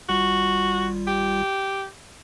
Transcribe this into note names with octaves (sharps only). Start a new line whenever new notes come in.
G#1 G3 F4 F#4
G4